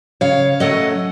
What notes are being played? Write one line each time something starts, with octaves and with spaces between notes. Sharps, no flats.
C#3 C#5 F5
F#3 A3 C#4 D#5 F#5